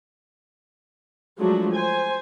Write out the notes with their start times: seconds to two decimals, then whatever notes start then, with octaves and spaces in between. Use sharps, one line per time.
1.39 F3 F#3 G#3 A3 D4 F#4
1.73 C5 G#5